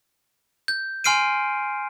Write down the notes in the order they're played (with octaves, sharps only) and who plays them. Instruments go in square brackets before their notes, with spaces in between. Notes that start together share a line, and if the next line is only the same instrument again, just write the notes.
[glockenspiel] G6
G#5 C6 F6 C7 D7 D#7